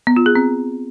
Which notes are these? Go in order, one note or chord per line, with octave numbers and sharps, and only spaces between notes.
B3
F4
G#4
C4